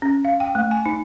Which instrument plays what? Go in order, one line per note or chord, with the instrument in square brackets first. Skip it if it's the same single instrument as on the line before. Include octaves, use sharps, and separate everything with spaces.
[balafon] C#4
F5
G5
A3
G#5
D#4